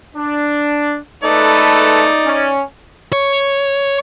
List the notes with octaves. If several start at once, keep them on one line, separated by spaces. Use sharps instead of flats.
D4
A3 D#4 A4 B4 D5
C#4
C#5